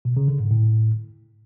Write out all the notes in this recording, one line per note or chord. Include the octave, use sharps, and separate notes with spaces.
B2
C#3
D3
G#2
A2